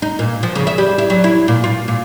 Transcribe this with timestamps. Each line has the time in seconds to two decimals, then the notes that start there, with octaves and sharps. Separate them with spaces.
0.02 D#4
0.19 A#2
0.43 F3
0.55 C#3
0.67 E5
0.78 G3
0.98 E4
1.10 F#3
1.24 E4
1.48 A#2
1.64 F4
1.88 A#2